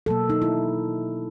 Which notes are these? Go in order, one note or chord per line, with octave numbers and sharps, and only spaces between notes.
B2 F#3 A#3 A4
D#4
E4